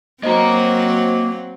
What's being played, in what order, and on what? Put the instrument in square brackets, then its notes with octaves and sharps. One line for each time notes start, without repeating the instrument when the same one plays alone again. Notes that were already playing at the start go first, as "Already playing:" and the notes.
[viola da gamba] F#3 C4 [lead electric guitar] A#3 A#5 [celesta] F#4 C5 D#5